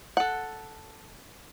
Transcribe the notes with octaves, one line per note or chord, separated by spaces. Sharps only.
A4 F#5